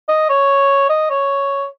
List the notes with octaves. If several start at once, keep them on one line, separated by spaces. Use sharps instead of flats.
D#5
C#5
D#5
C#5